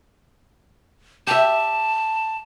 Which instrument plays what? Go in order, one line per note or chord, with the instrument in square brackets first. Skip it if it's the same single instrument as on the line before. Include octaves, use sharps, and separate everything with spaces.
[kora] G4 E5 [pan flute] A5